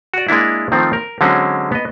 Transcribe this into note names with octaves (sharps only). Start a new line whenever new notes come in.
F#4 D5
G#3 A#3 D4 E4
D#3 F3 A3 C4
A#4
D3 F#3 G#3 C4 C#4
B3 D#5